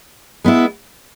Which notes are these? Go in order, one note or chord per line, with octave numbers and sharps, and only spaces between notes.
G#3 B3 E4